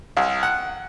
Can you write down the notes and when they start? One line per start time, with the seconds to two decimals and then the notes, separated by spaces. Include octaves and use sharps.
0.17 C2
0.43 F#5